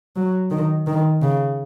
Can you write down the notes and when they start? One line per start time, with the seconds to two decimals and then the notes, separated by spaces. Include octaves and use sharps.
0.16 F#3
0.51 D#3
0.87 D#3
1.22 C#3